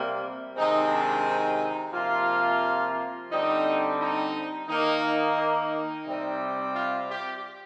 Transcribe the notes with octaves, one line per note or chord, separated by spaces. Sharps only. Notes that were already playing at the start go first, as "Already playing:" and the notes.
Already playing: C3 G3 A#3
C3 D#3 G#3 C4 D#4
D4
D#4
C3 F3 A#3 F4
D3 G3 C4 D#4
D#4
D#3 A#3 D#4
D#4
C3 G3 C4
F4
G4